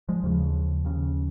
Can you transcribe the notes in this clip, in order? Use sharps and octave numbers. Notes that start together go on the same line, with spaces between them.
F3 G#3
D#2 C#3 F3
D#2 C#3